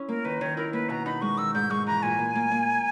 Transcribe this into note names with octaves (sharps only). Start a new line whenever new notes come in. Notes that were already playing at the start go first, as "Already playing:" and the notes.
Already playing: C#4 E4
A#3 A#4
D#3 B4
D#3 C#5
E4 A#4
A#3 B4
B2 A#5
D#4 B5
G#3 C#6
D#3 E6
G#2 G6
G#3 C#6
E3 A#5
A#2 G#5
A#3
A#3
A#3